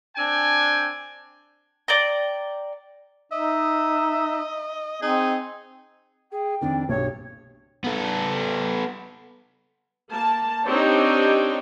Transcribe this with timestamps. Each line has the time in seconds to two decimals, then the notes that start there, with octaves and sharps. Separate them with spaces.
0.16 C4 D4 G5 G#5
1.88 D5 G5 A#5
3.32 D#4 D#5 E5
5.02 C4 D#4 G#4
6.32 G#4 G5
6.61 F2 D#3 D4
6.89 B1 G2 C#5
7.84 B3 A4
10.12 A#3 A5
10.67 C4 D4 D#4 G4 C#5 G5